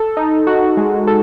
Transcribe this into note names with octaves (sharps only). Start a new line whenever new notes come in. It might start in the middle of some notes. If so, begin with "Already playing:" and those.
Already playing: A4
D#4
F#4
G#3
A4